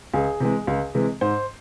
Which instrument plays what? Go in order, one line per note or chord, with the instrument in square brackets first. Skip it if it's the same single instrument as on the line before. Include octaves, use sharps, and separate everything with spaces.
[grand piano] C#2 G#4
C3 E3 G#3
C#2
C3 E3 G#3
G#2 C5